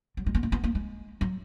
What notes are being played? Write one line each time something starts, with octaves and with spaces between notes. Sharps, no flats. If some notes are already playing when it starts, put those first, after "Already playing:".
F#3
G#3
B3
A#3
B3
A#3
G#3
F#3